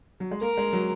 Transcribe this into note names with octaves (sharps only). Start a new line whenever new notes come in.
F#3
G#3
A#3 A#4
G#3
F#3